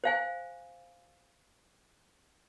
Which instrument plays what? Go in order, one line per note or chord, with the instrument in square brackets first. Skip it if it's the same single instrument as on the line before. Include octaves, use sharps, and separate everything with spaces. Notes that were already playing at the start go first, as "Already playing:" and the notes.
[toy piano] C5 F5 G#5